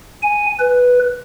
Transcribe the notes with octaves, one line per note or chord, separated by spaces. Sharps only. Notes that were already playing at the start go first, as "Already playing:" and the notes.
G#5
B4